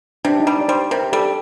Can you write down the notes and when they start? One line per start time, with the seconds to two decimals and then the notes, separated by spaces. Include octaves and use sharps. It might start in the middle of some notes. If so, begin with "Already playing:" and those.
0.25 C3 D4
0.40 D#4
0.47 G3
0.61 D5
0.68 G3 C5
0.91 C3 A#4
1.13 G3 A4